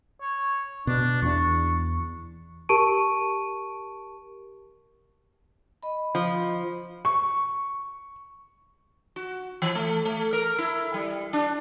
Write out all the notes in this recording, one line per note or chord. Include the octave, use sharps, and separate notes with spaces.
C#5
B2 D4
E2 D4 C#6
G4 A#4 A5 C#6 D7 D#7
D#5 B5
F3
C#6
F#4
E3
A3
A3
A#4
E4
G3
D4